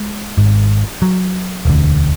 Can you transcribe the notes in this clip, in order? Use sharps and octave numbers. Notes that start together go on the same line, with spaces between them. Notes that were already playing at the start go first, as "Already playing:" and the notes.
Already playing: G#3
G#1 G#2
F#3
E1 D2 D3